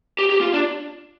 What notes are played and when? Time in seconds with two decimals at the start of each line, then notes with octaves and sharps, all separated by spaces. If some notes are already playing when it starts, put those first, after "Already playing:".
0.19 G4
0.30 G4
0.41 F4
0.54 D4